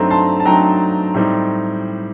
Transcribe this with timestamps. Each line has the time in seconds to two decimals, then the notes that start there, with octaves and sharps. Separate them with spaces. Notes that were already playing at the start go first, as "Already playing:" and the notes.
Already playing: G2 F#3 A3 C4 D#4 A#5
0.11 A5 C6
0.40 A5
0.45 G2 F#3 A3 C4 D#4 G5 A#5
1.14 A2 G3 C4 D#4